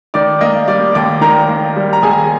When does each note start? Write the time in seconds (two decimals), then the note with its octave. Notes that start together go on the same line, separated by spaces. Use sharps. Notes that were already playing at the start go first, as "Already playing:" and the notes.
0.14 D#3 D5 D6
0.41 A#3 D#5 D#6
0.67 G3 D5 D6
0.94 D#2 D5 D6
1.21 D#3 A#4 A#5
1.49 A#3
1.76 G3
1.93 A#5
2.03 D#2 G#4 G#5